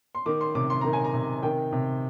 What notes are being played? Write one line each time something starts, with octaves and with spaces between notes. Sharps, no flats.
C6
D#3 D6
C6
C3 D6
C6
D#3 A#5
G#5
A#5
C3
D#3 G5
C3